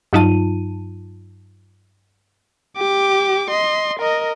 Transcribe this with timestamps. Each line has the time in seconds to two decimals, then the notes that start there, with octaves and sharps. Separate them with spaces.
0.13 G2 F#3 D#4 F4 A5 D#7
2.77 G4 D6
3.50 D#5 C6
4.00 A#4 D#5